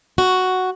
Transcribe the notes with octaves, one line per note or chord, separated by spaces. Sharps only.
F#4